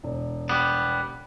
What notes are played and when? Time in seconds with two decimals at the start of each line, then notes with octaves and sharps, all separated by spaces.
0.03 E1
0.49 G3 B3